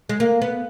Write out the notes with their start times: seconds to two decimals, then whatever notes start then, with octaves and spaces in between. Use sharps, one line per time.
0.09 G#3
0.20 A#3
0.42 B3